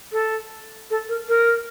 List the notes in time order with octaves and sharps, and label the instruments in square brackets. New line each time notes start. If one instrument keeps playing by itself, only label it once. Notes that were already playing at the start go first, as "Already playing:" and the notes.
[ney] A4
A4
A#4
A#4